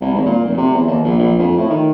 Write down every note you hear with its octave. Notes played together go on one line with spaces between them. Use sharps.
C2
G#1
A#2
F1
C3
E2
D#2
A#1
A#1
F2
A2
D#3